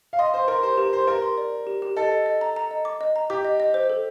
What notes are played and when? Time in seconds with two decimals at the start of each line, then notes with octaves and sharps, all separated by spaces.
0.13 F5
0.19 D#5 C6
0.34 C5 F5
0.48 A#4 C6
0.63 G4 C5
0.78 G4 A#4
0.93 C5 C6
1.07 G4 A#4
1.22 C6
1.38 D5
1.52 D5
1.67 G4
1.82 G4
1.96 A4 D#5
2.12 D#5
2.26 D#5
2.41 A#5
2.56 A#5
2.71 D#5
2.85 D6
3.01 D#5
3.16 A#5
3.30 G4 D6
3.45 D#5
3.60 D#5
3.74 C5
3.90 A4